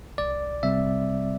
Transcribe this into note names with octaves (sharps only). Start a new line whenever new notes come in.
C2 D5
C3 G3 C4 E5